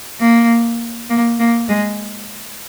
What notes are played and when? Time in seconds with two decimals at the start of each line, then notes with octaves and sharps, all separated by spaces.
0.20 A#3
1.09 A#3
1.39 A#3
1.68 G#3